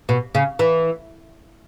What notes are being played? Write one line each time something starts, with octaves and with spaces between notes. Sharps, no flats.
B2
C#3
E3